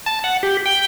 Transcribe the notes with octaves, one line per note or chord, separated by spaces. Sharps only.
A5
F#5
G4
G5